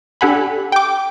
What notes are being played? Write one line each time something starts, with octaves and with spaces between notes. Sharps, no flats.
D4 G4 A4 F#5 G#5 B5
G5 D6